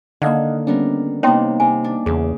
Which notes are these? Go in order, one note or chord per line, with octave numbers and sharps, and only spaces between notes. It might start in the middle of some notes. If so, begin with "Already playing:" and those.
D3 D#3 A#3 D#4 D5 D#5 F5 F#5
G3 B3 C#4 D4 A#4
C3 A#3 B3 D#4 C#5 G5 C6
C3 G#5
D4
E2 C#3 G#4